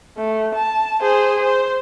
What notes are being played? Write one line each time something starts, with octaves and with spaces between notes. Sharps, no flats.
A3
A5
G#4 C5
C5